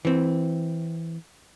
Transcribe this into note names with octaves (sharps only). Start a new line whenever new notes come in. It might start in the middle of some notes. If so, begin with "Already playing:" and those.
E3 C4